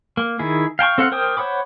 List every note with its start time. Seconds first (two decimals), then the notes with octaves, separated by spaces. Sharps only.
0.17 A#3
0.39 D#3 E4 G#4
0.79 F5 G5 A5 C#6
0.98 C4 A4 F5 F#5
1.12 A#4 C5 G5 D6 D#6
1.37 C5 C#5 F#5 B5 D6